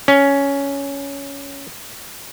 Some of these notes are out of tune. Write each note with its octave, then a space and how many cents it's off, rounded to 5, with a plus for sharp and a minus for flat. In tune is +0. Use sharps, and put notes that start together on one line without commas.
C#4 +10